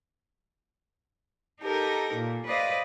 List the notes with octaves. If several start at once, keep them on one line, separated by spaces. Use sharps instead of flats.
D#4 G4 A4 A#4
A#2
B4 C5 D5 D#5 F5